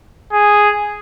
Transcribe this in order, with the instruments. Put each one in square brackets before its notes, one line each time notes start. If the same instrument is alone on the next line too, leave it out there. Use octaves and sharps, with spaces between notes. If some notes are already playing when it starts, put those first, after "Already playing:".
[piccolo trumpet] G#4